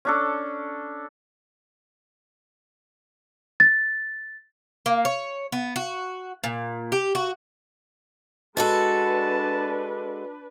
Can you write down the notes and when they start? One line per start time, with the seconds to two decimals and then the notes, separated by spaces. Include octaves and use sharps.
0.05 C#4 D4 A4
3.60 A6
4.86 A#3
5.05 C#5
5.52 B3
5.76 F#4
6.44 A#2
6.92 G4
7.15 F#4
8.57 G#3 D4 F#4 A4 B4 A5